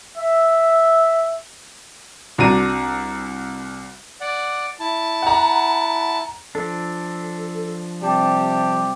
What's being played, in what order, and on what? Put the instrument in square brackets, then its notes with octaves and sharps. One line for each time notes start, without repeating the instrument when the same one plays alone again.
[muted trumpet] E5
[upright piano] C2 D4 F#4 A#5 D#7
[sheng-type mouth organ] D5 F#5
E4 A5
[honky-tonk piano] F#5 A#5
[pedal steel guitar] F3 D4 [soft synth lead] A4
[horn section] C3 G3 G4 [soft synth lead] A5